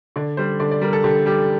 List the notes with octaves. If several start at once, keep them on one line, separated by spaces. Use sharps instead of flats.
D3 D5
G3 C5
D3 D5
D5
G3 A#4
A4
D3 G4
G3 G4